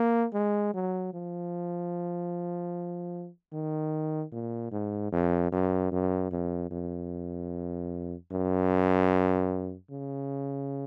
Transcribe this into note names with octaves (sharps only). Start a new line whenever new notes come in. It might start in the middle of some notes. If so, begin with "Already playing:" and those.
Already playing: A#3
G#3
F#3
F3
D#3
A#2
G#2
F2
F#2
F#2
F2
F2
F#2
C#3